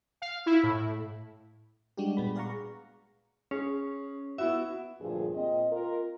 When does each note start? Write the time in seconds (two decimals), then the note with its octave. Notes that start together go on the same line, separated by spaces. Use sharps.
0.22 F5
0.46 E4
0.63 A2
1.97 G3 G#3 D4 F#4 G4
2.17 A#2 B3 B5
2.35 G#4 D5 F5 F#5 A#5 C#6
3.51 C#4 G#4
4.38 B3 E4 F#4 E5
5.01 D2 G2 A#2 F3 G#4
5.34 A#2 C4 D#5
5.72 F4 A#4